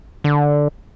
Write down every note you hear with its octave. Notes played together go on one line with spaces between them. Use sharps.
D3